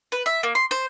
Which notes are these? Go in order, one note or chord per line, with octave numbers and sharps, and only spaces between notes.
B4
E5
A#3
C6
C5